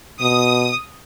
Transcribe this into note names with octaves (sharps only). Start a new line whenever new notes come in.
B2 D#6